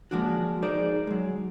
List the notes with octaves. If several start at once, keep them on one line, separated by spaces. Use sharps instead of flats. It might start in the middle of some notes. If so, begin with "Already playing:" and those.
F3 G#3 A#3 D4 F#4
D#4 G#4 A#4 C5 D5
F#3 G#3